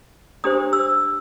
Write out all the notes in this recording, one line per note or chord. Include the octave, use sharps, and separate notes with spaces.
D4 G4 C5 D#6
E6